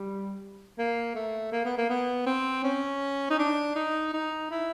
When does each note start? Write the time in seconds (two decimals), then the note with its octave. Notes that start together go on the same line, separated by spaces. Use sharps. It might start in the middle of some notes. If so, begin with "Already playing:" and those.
Already playing: G3
0.78 A#3
1.15 A3
1.52 A#3
1.65 B3
1.77 A#3
1.90 B3
2.26 C4
2.64 C#4
3.30 D#4
3.39 D4
3.76 D#4
4.14 D#4
4.51 E4